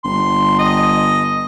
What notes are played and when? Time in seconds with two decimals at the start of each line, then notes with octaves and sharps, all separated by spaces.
0.04 G1 C6
0.59 D#5